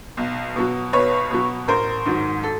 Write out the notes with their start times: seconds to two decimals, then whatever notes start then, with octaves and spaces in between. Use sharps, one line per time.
0.17 B1
0.56 B2 F#3
0.93 B1 B4 C#5
1.31 B2 F#3
1.68 A1 A#4 C5
2.06 G#2 D#3 F#3
2.43 A4